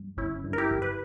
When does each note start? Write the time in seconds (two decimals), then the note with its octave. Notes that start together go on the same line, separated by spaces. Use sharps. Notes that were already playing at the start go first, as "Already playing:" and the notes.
Already playing: G2
0.17 G1 C#4 E4
0.44 G2
0.53 A#4
0.58 E4 G4
0.71 G1
0.82 B4